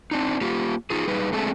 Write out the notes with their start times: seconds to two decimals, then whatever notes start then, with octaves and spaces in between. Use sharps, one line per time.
0.11 C4 D4 D#4
0.41 A#3 F4 G4
0.90 D#4 F4 G#4
1.08 G3 D#4 G#4 B4
1.33 G#3 A3 C4 D4 G#4 A4